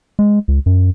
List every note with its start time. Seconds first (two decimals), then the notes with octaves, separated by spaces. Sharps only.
0.19 G#3
0.48 C#2
0.66 F#2